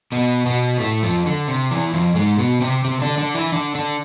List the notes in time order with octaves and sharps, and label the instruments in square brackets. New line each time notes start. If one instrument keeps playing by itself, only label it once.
[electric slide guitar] B2 B3
B2 B3
A2 A3
F2 F3
D3
C3
E2 E3
F2 F3
G#2 G#3
B2 B3
C3 C4
C3 C4
D3 D4
D3 D4
E3 E4
D3 D4
D3 D4